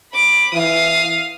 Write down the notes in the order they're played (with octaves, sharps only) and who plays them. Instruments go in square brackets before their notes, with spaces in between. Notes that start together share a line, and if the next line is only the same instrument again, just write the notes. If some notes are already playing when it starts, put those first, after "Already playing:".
[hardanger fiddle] B5 D6
[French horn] E3 [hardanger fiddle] F5 D#6